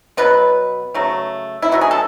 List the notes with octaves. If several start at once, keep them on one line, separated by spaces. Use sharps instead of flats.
B2 F#3 B3 B4
C#3 F#3 A3
E4
B2 F#3 A3 F#4
G#4
A4